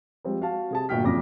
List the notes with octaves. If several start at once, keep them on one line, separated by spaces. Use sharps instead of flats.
F3 G3 G#3 C4
F#4 F5 A5
C3 G#4 A5
G1 A#2 F#4 G5 F6 B6
F#1 F2 D4 F4 D6 A#6